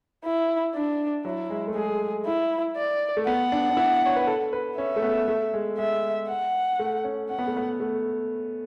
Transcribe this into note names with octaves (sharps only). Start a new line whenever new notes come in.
E4
D4
F#3 E4
G#3
A3
G#3 G#4
E4
D5
A3
B3 F#5
D4
D4
E4
C#5
B4
A4
B4
C#4 E5
A3
B3
A3
G#3
G#3 E5
F#5
A3
C#4
C#4 F#5
B3
A3
B3
A3